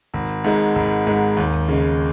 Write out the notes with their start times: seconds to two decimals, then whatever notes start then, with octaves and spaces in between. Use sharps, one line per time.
0.14 G#1
0.44 G#2 G#3
0.76 G#1
1.07 G#2 G#3
1.37 D#2
1.68 C#3 G#3